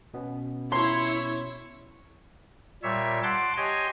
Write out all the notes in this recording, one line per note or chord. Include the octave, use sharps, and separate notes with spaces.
B2 B3 C#4
E4 C#5 C6
A#2 G3 C#5 E5
F#5 A5 C6 D6
G4 C#5 D#5 G#5 C6